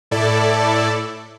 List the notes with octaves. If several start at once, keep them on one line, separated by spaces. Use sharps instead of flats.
A2 E4 A4 D5